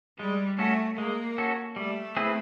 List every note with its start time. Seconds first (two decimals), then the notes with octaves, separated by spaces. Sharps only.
0.19 G3 G#3
0.59 A3 C#4 F#4 A4
0.98 G#3 A#3
1.38 C#4 F#4 A4
1.76 G3 A3
2.17 C4 E4 G#4 B4